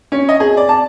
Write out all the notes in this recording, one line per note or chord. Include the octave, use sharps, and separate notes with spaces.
C#4
D#5
G#4
D5
A5